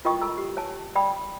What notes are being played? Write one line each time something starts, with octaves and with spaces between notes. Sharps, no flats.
F4 A#4 D#5 G5 C#6 D#6
A4 A#5 E6
G4
C#5 G#5 A5
D5 G5 B5 D#6